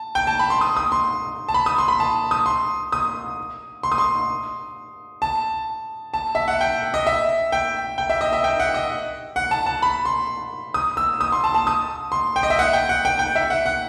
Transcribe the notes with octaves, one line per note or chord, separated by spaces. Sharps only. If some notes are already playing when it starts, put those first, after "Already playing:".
Already playing: A5
G5
A5
B5
C6
D#6
D#6
C6
A5
B5
D#6
C6
B5
A5
D#6
C6
D#6
C6
D#6
C6
A5
A5
E5
F#5
G5
D#5
E5
G5
G5
E5
D#5
E5
G5
F#5
D#5
F#5
A5
A5
B5
C6
D#6
E6
D#6
C6
A5
A5
D#6
C6
G5
D#5
E5
F#5
G5
F#5
G5
G5
E5
F#5
F#5